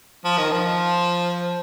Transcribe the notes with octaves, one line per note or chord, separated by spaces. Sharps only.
F3
D#3
F3